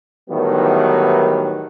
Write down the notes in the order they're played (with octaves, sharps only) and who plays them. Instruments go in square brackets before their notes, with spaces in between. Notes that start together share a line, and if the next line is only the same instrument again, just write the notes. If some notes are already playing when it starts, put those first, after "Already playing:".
[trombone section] A2 D#3 E3 F#3 G3 B3